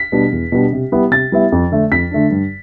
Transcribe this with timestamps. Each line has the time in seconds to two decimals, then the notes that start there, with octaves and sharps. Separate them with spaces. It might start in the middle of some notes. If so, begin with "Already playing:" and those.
Already playing: B6
0.12 B2 G3 B3 D4
0.32 E2
0.52 B2 G3 B3 D4
0.72 C3
0.92 G3 B3 E4
1.11 C3 A6
1.32 G3 B3 E4
1.52 F2
1.72 D3 A3 D4
1.91 F2 B6
2.11 D3 A3 D4
2.31 G2